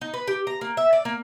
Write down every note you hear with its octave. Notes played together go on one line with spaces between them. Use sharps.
D#4
B4
G4
A#5
A#3
E5
D5
A#3